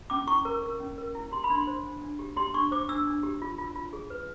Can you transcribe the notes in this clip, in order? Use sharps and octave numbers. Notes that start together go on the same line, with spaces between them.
C#4 D6
E4 C#6
A#4
A#4
C#4
A#4
E4
G4 C6
B5
D4
C6
C5
D4
D4
G4
G4 C6
D4 C#6
C5 D6
D4 E6
D4
G4
F4
F4
F4
G#4
B4